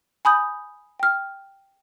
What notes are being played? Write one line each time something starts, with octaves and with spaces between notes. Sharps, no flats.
G#5 B5 D#6 G6
G5 F6